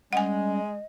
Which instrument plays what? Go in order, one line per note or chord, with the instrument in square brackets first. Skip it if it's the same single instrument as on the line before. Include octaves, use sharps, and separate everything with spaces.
[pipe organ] G3 C#4 [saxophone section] G#3 [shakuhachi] D#5 [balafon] F#5 G#5